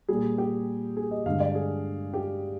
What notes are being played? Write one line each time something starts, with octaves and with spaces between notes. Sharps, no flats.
A#2 G3 G#4
G4
G#4
D#5
G2 D3 G#3 F5
D5
G#4
G4